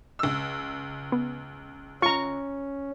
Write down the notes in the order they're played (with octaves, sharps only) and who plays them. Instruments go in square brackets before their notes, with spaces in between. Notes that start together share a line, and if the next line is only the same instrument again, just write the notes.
[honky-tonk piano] C#2 E6
[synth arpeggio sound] B3
[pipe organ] C#4 [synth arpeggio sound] F4 [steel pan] A#5 C#6